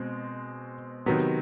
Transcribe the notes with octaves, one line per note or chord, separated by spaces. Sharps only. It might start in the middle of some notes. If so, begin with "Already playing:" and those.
Already playing: B2 G#3 C4
C3 D#3 F#3 B3